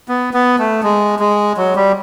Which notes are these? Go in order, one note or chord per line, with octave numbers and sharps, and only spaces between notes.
B3
B3
A3
G#3
G#3
F#3
G3